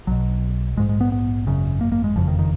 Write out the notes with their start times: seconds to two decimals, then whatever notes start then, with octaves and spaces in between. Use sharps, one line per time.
0.07 B1 B2 F#3
0.76 A#1 G#2 G#3
0.89 G#3
1.01 B3
1.12 B3
1.47 G#1 F#2 C#3
1.81 A#3
1.92 A#3
2.04 G#3
2.15 F#1 F2 C#3 F3
2.27 D#3
2.39 D#3